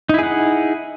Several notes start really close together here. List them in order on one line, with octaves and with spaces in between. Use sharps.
D#4 E4 G#4 F#5